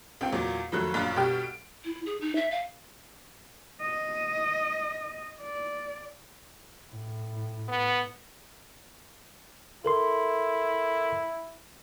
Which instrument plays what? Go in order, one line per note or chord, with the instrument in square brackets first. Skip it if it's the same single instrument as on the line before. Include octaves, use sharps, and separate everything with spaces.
[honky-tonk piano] C#2 C4 G5
E2 A#2 E3 F#3
F2 D#3 F#3 A3 F#6
A#1 F#2 F4 F#6
B2 G3 G4 G5 F6
D7
[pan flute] E4
G#4
D#4
E5
F5
[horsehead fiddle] D#5
D5
[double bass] A2
[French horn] B3
[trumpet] E4 [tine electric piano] A4 A#4 C6